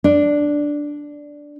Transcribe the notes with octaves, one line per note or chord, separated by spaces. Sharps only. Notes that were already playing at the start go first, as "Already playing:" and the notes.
D4